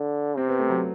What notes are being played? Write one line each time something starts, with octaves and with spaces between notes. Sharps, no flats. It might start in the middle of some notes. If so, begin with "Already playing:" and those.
Already playing: D3
C3 C4
B3
A3
F#3